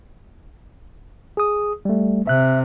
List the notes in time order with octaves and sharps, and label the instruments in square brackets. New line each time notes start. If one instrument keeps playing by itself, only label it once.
[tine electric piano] G#4 D#6
G3 A3
[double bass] C3 [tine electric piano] E5 F#6